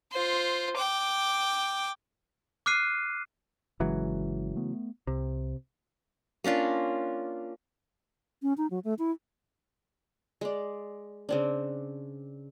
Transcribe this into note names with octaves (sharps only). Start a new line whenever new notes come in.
F4 C5
G5 D6
D6 F6 F#6 C7 D#7
G1 C#3 E3 F#3 G#3
A3 B3
C2 C3
A#3 C#4 D4 F4
C#4
D#4
F#3
A3
E4
G#3 D5
C#3 C4 D4